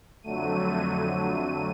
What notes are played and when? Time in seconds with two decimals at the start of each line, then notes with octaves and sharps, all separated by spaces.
0.23 F2 D3 F#3 A3 D#7